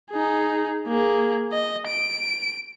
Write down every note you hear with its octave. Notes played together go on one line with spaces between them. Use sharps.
D#4 G#4
A#3 G#4
D#5
D7